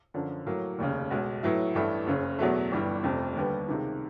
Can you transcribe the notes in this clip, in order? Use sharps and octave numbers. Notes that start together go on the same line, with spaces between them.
F#2 D3 F3
A2 F#3 A#3
F1 D#2 C#3
B1 B2 G#3
A2 F#3 B3 E4
A1 G2 E3 A3
F#1 F#2 C#3
E2 B2 F#3 A3
G1 G2 E3 G3
F1 F2 C3
D#2 D3 G3 B3
C#2 C3 D#3